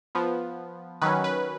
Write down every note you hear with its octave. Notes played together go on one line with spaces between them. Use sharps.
F3 B3
D#3 F#3 C#4 B4
B4